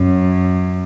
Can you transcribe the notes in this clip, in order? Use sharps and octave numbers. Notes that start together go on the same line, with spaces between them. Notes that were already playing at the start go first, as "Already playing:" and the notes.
Already playing: F#2